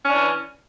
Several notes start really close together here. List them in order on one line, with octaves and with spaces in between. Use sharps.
C#4 D4 E3